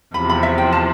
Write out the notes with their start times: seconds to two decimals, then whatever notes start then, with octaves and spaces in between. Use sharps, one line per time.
0.14 E2 C3 F3 B5
0.30 B5
0.43 E5
0.58 G5
0.73 A5